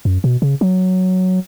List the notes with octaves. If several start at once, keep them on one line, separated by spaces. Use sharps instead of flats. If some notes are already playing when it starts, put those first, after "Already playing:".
F#2
B2
C#3
F#3